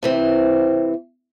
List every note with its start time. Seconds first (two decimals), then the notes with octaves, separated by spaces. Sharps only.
0.03 C3 E3 C4